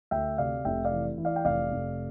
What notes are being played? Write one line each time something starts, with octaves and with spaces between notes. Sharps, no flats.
D2 E5 G5
C3 D5 F5
F1 E5 G5
D5 F5
E3
E3
D5 F5
G5
F1 D5 F5
F1